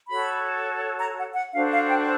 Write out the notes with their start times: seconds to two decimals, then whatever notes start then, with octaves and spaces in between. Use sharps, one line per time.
0.09 F#4 A4 C#5 B5
1.00 A#5
1.18 F#5
1.35 F#5
1.54 D4 F#4 A4 C5 F5
1.72 F5
1.90 G5